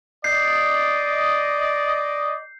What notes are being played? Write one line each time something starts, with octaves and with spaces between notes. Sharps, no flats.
D5 D#5 G6 C7